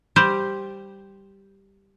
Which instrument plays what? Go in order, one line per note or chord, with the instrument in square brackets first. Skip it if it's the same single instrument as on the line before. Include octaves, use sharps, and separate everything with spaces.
[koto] G3 G4 C5